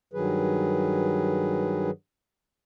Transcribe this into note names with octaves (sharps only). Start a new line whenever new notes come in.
G2 D#3 F#3 G#4 B4